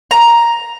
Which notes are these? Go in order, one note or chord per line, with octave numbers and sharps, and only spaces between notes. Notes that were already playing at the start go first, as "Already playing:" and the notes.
A#5